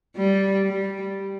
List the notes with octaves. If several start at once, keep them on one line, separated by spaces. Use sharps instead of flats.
G3
G3